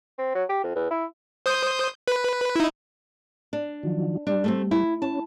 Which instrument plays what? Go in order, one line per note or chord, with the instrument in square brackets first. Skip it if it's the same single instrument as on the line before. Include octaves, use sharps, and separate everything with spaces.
[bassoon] C4
F#3
G4
F2
E2
E4
[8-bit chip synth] C5 D#6 G6
B4
D#4 E4
[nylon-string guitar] D4
[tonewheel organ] D#3 F3 F#3
[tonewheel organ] G3 [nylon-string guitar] D4
[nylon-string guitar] A3 A#3 C4
E4
[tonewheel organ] C#4 [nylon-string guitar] A5